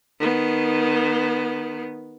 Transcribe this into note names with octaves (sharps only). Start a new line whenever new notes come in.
D#3 B3